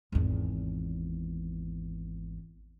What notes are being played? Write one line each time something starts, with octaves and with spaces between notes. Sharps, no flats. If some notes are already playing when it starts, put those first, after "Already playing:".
G#1 E2